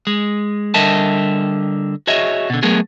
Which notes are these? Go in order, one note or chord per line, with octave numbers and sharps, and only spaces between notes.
G#3
D3 G3 A#4 D#5 E5 A5
F#4 G#4 C#5 D#5 E5
B2 D3
F#3 A3 B3 G#4 A#4